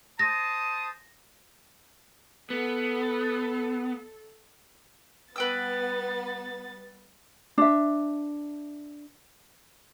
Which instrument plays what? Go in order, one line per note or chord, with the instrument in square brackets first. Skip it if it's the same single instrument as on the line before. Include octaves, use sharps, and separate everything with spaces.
[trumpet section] C5 A5 D#6 [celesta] A#6
[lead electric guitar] B3 [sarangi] A4
[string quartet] G3 A6 [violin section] B3 [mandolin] B4 G5 E6
[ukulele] D4 E5